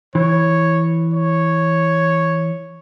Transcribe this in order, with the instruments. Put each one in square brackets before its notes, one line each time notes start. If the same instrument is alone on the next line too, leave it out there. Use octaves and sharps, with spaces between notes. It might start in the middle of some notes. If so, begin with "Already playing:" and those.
[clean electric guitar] E3 [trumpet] C#5
[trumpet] C#5